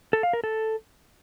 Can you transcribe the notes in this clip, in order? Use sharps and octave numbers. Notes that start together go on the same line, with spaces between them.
A4
F5
A#4
A4